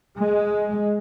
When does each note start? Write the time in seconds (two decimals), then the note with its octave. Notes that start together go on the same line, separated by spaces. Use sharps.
0.19 G#3